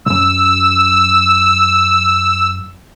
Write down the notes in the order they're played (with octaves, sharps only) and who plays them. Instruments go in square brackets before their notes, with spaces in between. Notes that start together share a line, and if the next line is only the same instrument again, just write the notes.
[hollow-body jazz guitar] B1 F#2 [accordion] E6